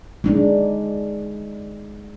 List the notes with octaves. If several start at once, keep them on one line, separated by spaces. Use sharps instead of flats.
G#3 D4 D#4